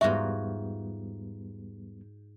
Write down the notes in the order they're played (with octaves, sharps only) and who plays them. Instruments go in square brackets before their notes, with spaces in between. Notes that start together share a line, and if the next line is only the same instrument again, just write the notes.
[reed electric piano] E2 G3 B3 [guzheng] G#2 F4 F#4 [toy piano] E5